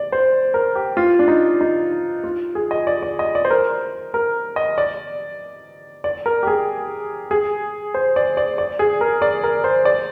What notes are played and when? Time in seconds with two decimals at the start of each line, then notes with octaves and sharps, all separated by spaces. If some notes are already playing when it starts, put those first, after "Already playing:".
Already playing: D5
0.12 C5
0.54 A#4
0.75 G4
0.97 F4
1.19 D4
1.28 D#4
1.61 D#4
2.24 F4
2.55 G#4
2.71 D#5
2.87 D5
3.03 D5
3.19 D#5
3.35 D5
3.45 C5
3.50 A#4
4.14 A#4
4.56 D#5
4.78 D5
6.04 D5
6.26 A#4
6.43 G4
6.47 G#4
7.31 G#4
7.94 C5
8.16 D5
8.37 D5
8.58 D5
8.79 G#4
9.01 A#4
9.22 D5
9.44 A#4
9.64 C5
9.85 D5